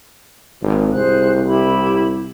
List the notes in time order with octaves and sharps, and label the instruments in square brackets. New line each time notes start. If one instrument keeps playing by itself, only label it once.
[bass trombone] G#1
[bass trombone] C2 [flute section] G#4 C5 F#6
[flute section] E4 G4 B5